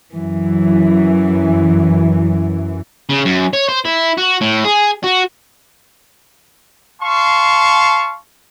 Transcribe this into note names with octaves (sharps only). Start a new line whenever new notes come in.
F#2 E3
C#3
F#2
C#5
C5
E4
F#4
A2
G#4
F#4
F5 A5 C6 C#6